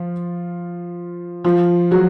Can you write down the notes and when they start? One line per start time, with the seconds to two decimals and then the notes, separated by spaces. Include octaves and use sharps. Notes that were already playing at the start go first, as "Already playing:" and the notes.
Already playing: F3 F4
1.44 F3 F4
1.91 F#3 F#4